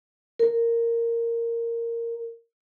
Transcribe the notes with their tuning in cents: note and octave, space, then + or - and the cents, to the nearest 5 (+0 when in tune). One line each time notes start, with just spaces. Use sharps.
A#4 -10